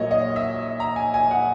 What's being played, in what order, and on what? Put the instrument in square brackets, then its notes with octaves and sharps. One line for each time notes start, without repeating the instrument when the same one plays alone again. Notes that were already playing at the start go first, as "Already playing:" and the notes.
Already playing: [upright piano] A#1 A#2 F#3 A#3 C#5 D#5
D#5
E5
A#5
G#5
G#5
F#5